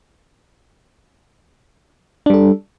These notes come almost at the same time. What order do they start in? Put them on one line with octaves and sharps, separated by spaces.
D4 G3 A4